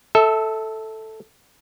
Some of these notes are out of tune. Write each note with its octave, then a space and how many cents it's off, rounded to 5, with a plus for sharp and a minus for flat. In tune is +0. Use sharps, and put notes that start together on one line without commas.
A4 +0 E5 -25